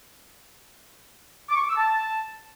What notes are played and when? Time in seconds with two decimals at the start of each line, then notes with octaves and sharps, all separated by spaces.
1.49 D6
1.56 C#6
1.63 D6
1.70 E6
1.76 A5